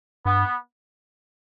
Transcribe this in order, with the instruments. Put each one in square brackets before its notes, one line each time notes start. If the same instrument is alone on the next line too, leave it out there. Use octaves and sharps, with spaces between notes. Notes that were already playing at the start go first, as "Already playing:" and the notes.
[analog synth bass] G2 [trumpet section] B3